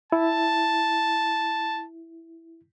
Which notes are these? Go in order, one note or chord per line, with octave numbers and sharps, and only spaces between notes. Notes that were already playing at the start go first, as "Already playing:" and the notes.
E4 A5